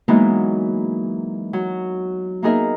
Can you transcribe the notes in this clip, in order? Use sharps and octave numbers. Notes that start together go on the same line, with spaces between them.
E3 F#3 G#3 A#3 B3 D#4
F#3
A#3 B3 D#4 G#4 A#4 E5